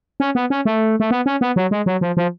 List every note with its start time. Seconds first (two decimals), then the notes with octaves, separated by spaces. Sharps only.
0.20 C#4
0.35 B3
0.50 C#4
0.65 A3
1.00 A3
1.11 B3
1.26 C#4
1.41 B3
1.56 F#3
1.71 G#3
1.86 F#3
2.01 F3
2.17 F3